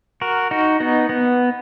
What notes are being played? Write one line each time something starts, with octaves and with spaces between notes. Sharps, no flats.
F#4 A#4
D#4 F#4
B3 D#4
B3